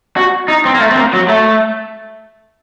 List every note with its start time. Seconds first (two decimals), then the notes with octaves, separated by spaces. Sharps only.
0.16 F#4
0.48 D#4
0.65 C4
0.75 A#3
0.81 A3
0.91 C4
0.96 A#3
1.13 F#3
1.28 A3